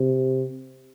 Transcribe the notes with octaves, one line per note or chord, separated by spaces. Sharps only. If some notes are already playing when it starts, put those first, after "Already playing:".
Already playing: C3